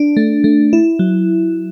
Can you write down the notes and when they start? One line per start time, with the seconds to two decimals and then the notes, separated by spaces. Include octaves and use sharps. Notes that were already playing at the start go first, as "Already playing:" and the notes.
Already playing: D4
0.17 A3
0.44 A3
0.73 E4
0.99 F#3